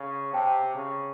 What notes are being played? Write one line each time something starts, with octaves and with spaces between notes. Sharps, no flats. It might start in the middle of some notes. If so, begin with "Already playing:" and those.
Already playing: C#3
C3 G5 A5
C#3